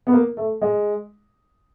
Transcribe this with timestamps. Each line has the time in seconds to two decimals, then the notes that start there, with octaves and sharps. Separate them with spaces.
0.07 B3
0.12 A#3
0.37 A3
0.62 G#3